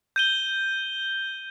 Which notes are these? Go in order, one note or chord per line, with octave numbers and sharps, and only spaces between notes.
G6 D#7 G7